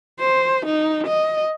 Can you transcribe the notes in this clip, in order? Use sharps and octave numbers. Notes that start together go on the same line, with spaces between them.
C5
D#4
D#5